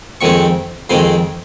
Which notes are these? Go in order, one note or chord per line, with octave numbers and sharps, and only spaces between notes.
F2 D#3 G#3 C4 C#6
F2 D#3 G#3 C4 C6